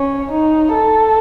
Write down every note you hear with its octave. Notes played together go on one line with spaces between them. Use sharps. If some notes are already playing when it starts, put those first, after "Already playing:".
Already playing: C#4
D#4
A4